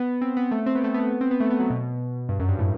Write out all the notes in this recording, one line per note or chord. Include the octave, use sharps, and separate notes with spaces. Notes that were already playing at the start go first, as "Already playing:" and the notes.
Already playing: B3
C4
B3
A3
C4
B3
A3
B3
C4
B3
A3
B3
F#3
B2
G2
F#2
G2
A2